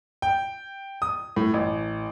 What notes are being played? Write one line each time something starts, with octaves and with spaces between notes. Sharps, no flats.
G5
D#6
A2
A1